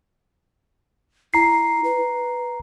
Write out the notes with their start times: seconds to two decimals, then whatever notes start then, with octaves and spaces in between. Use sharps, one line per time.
1.34 E4 A#5 C7
1.84 B4